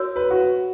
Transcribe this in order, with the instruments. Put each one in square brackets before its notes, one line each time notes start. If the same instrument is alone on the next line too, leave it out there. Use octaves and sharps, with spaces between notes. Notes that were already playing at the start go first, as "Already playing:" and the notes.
Already playing: [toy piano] F#4 A#4 C#5
[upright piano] B4
F#4